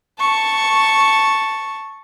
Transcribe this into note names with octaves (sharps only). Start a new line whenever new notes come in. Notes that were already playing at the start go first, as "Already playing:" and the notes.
A5 C#6